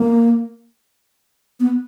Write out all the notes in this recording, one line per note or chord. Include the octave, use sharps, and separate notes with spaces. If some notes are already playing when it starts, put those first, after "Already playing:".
Already playing: A#3
B3